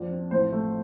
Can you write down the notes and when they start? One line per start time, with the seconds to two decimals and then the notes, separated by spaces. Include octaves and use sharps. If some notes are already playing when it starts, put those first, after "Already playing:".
Already playing: F2 D4
0.10 C4
0.31 A1 C5
0.52 A3